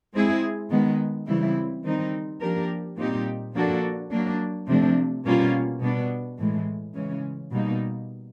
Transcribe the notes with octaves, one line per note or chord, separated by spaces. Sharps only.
G#3 C4 E4 G#4
D#3 G#3 B3
C#3 E3 G3 C4 E4
D#3 G3 C4 D#4
F3 A#3 D4 G4 A#4
A#2 G3 C4 D#4 G4
F3 A#3 D4 F#4 A4
F#3 A#3 D4
C3 F3 A3 D4
B2 G3 A#3 C#4 F4
B2 G3 B3 D4
A2 E3 G#3
C#3 E3 G#3 C#4
B2 G3 A#3 D#4